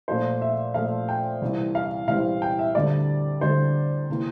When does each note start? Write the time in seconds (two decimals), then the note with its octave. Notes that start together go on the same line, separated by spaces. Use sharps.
0.08 A#2 F3 A3 C5
0.42 E5
0.74 A#2 F3 A3 F5
1.09 G5
1.42 C2 C3 E3 G3 C4
1.75 F5
2.08 C2 C3 E3 G3 C4 F5
2.42 G5
2.59 E5
2.75 D2 D3 G3 C4 D5
3.41 D2 D3 G3 C4 C5
4.10 C3 E3 A#3